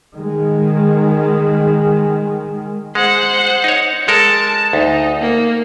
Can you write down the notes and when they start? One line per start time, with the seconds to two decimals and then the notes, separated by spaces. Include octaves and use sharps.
0.15 D#3 G#3
2.95 G#3 C5 F#5
3.64 D#4 C#5
4.08 G#3 A4 A#4 A5
4.73 D2 D#4
5.21 A#3